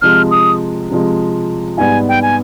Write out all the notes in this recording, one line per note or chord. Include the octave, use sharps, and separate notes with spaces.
C3 F3 G#3 F6
D#6
C3 F3 G#3
G#2 G3 B3 G#5
G5
G#5